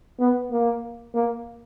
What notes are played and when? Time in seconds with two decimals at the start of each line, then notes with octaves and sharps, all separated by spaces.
0.20 B3
0.52 A#3
1.14 A#3